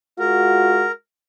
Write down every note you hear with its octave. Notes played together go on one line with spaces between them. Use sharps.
G#3 F4 F#4 A#4